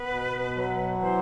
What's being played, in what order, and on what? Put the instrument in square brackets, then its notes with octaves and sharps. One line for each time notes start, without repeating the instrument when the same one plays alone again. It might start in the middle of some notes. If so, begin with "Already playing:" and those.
Already playing: [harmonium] B3 [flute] B4
[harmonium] B2
F#3
[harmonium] E3 [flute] C5